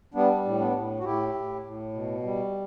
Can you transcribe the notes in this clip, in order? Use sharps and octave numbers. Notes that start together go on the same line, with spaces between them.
G3 B3 D4
A2
B3 D4
A2
F#4
A2 E4 G4
A2
A2
B2
G3